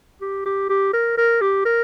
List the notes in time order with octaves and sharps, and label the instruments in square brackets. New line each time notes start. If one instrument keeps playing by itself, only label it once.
[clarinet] G4
G4
G4
A#4
A#4
G4
A#4